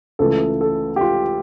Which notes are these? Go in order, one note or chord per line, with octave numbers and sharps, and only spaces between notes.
C#2 C#3 E3 A3 A4
A4
G4
F4